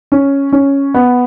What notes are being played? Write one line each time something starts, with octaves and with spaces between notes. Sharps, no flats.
C#4
C#4
B3